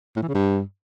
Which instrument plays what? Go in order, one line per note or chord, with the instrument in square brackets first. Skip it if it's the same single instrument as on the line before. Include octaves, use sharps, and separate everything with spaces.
[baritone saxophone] A2
E3
C#3
G2